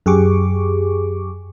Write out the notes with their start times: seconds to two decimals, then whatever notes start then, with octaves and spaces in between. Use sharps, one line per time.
0.06 F#2 G4 G#4 C#6 D6